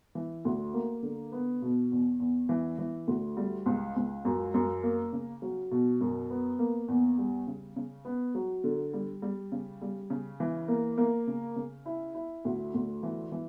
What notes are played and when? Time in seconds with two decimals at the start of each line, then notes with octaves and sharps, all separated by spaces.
0.15 E3
0.45 D2
0.74 A#3
1.03 D3
1.32 B3
1.62 B2
1.92 E2
2.20 E2
2.49 E3
2.78 E3
3.07 D2
3.37 G3
3.66 C#2
3.96 C#2
4.25 F#2
4.54 F#2
4.83 A#3
5.13 C#3
5.42 F#3
5.71 B2
6.01 F#2
6.30 B3
6.59 A#3
6.88 E2
7.18 G3
7.47 C#3
7.76 C#3
8.05 B3
8.35 F#3
8.64 D3
8.93 G3
9.22 G3
9.52 C#3
9.82 G3
10.10 C#3
10.40 E3
10.68 A#3
10.98 A#3
11.27 C#3
11.56 C#3
11.86 E4
12.14 E4
12.45 D2
12.74 D2
13.03 E3
13.32 E3